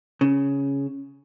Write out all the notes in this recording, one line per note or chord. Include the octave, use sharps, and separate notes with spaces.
C#3